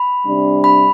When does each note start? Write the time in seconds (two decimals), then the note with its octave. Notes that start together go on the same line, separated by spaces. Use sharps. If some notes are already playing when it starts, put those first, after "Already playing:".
Already playing: B5
0.26 C3 G3 D4
0.64 B5